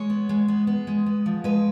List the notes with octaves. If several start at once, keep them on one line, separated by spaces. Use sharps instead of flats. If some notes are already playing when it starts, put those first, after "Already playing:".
Already playing: G#3 C#5
B3
G#3
B3
B3
G#3
B3
F3
G#3 B4